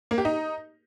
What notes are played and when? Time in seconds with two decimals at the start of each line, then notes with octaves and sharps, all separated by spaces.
0.11 A#3
0.18 G4
0.25 D#4